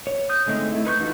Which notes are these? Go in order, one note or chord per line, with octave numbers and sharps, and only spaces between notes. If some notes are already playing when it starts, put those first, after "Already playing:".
C#5
D#6 G6
D3 G#3 A3 C4 D#4
A3 E4
D#4 B4 C#6 G6
E3 D#4 F4 F#4 A4